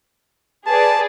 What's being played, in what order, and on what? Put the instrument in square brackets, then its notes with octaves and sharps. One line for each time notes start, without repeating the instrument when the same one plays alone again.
[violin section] G#4 B4 D5 [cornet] A5